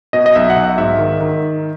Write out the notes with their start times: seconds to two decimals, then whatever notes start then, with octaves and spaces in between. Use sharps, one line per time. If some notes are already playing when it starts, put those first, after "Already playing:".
0.13 B2 D#5
0.26 D#5
0.35 B1 E5
0.50 F#5
0.56 B1
0.64 F#5
0.78 G#2 E5
0.99 D#3
1.21 D#3